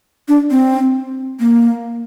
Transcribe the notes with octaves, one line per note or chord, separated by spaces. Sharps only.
D4
C4
A#3